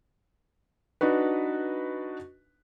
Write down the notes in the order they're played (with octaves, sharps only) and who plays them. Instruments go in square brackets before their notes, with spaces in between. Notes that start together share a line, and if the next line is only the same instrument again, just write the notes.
[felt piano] D4 D#4 F#4 B4